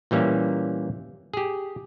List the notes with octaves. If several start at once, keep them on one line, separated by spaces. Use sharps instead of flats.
A#2 E3 G3 A#3 C#4
G4 G#4